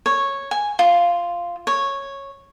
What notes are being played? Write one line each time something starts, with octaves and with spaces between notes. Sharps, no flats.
C#5
G#5
F4
C#5